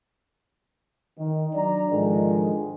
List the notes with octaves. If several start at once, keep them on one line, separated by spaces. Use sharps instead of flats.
D#3
F#3 D4 D5 A#5
G#2 D3 D#3 F3 G#3